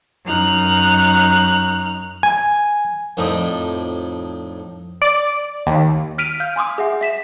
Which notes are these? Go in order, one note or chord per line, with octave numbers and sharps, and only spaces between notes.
F#2 D#4 F6 F#6
G#5
F2 A2 D#4 D5
D5
D#2
F6 B6 D7 D#7 F7
F5 F6 G6
G#5 C6 D6 D#6
G#4 E5 F#5
E5 B6 E7